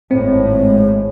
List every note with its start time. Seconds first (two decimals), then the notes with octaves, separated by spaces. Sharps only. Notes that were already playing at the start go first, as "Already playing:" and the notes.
0.11 G#1 A2 C4
0.51 G#3